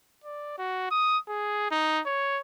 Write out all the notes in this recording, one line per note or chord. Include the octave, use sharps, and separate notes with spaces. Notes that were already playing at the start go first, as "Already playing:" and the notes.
D5
F#4
D#6
G#4
D#4
C#5